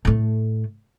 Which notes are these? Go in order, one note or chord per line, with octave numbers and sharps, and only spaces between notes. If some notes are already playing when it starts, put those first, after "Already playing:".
A2 A3